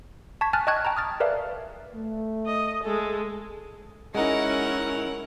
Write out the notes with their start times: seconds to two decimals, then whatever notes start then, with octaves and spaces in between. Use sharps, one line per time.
0.41 A5 C#6 G#6 B6
0.53 G#5 A5 F6 F#6 A6
0.67 D#5 G5 A5 C#6 F#6 G#6
0.85 G5 A5 A#5
0.97 D#6 F6 A6
1.20 A#4 B4 D5 E5 F5
1.94 A3
2.46 D#5
2.83 G#3 A4
4.15 G#3 C#4 D#4 E4 A#4 F#5